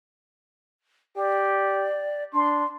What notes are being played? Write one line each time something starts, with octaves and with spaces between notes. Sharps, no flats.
G4 D5
D4 C6